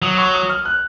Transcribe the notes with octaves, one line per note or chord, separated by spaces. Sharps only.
F#3 D#6
C#6
D#6
F6
F#6